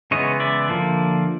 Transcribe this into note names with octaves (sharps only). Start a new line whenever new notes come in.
C#3 E3 G#3 B3 C#5 D#5
D5 E5
D3 F3 A#3